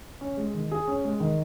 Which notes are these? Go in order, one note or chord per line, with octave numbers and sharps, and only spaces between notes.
C#4
G#3
D#3
G#4
C#4
G#3
D#3